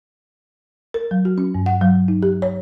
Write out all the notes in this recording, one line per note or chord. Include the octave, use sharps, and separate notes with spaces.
A#4
F#3
F#4
C#4
G2
F#5
F#3
D#4
G4
C#5